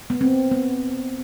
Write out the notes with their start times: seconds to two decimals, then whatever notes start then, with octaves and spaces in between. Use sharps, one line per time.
0.10 B3
0.21 C4
0.51 B3